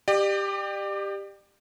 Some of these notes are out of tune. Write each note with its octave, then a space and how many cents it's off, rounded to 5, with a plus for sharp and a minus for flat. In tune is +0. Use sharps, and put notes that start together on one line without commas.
G4 +10 D5 +40